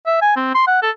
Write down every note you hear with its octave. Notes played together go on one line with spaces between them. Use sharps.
E5
G#5
C4
C6
F#5
A4